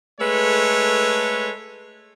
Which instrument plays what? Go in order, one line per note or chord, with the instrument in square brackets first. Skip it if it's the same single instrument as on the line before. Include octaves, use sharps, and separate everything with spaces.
[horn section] G#3 A3 A4 B4 C#5